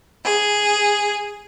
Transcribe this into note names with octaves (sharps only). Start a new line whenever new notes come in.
G#4